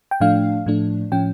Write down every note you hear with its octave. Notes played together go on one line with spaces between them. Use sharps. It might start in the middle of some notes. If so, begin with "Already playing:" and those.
G5
A2 F3 A3 D4 F5
A2 F3 A3 D4
A2 F3 C#4 G5